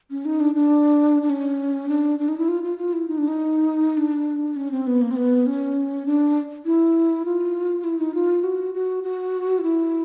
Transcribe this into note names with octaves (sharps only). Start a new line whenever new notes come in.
C#4
D#4
D4
D4
D4
C#4
D4
D4
D#4
E4
F4
F4
F4
E4
D#4
D4
D#4
D4
C#4
C4
B3
A#3
C4
B3
C#4
D4
E4
F4
E4
D#4
F4
F#4
F#4
F#4
F4
E4